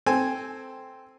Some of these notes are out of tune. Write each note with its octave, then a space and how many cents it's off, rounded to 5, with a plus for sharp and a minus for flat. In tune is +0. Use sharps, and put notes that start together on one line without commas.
C4 +0 A4 +0 G#5 +0